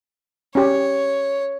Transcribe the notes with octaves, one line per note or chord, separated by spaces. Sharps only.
C#4 G4 C#5